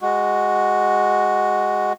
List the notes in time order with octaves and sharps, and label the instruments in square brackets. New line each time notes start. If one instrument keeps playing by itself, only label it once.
[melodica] G#3 F#4